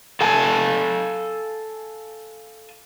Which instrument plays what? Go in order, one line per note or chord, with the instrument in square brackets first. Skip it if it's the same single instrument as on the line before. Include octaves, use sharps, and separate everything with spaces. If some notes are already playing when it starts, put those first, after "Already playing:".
[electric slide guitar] A4 F5 G#5 A5